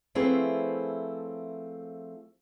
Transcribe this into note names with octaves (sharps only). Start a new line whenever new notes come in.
F3 A3 C4 E4 G#4 B4